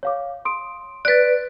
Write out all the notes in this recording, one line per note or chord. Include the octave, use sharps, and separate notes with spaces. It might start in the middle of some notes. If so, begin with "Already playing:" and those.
C#5 F5 D6
C6 D#6 D7
B4 D5 F#6 A6